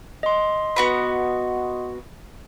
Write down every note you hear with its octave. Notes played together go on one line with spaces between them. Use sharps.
D#5 C6
B3 F#4 B5